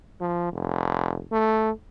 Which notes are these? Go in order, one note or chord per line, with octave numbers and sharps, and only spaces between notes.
F3
F1
A3